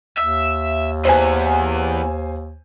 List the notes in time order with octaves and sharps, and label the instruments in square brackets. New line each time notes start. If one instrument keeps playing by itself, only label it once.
[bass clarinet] D#2 [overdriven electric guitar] E5
[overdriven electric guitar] E2 E3 [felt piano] C5 G#5